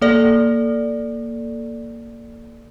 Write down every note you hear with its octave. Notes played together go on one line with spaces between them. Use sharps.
A#3 A4 D5